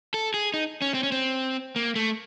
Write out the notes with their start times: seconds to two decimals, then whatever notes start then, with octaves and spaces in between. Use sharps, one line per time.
0.14 A4
0.34 G#4
0.54 D#4
0.82 C#4
0.94 C4
1.03 C#4
1.12 C4
1.76 A#3
1.96 A3